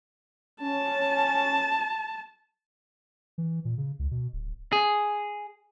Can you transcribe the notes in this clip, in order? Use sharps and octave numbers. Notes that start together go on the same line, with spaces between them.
C#4 A5
E3
A#2
C#3
C#2
B2
D1
G#4